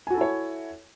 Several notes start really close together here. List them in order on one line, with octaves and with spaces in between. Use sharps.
G#5 F#4 A4 E4 C#5